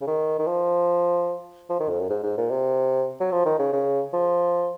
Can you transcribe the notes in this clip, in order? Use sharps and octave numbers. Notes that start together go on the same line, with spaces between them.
C#3
D#3
D#3
F3
F3
D#3
F2
F#2
G#2
G#2
A#2
C3
F#3
F3
D#3
C#3
C#3
F3